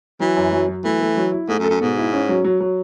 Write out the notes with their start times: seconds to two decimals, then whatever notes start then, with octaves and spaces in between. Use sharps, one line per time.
0.20 E3 F#3
0.37 F#2
0.52 F#3
0.68 F#3
0.84 E3 A3
1.01 A3
1.17 F#3
1.32 E4
1.48 G#2 A3
1.59 F#2
1.64 A4
1.70 F#2
1.81 G#2 B2
1.97 E4
2.13 C#4
2.29 F#3
2.45 F#3
2.61 F#3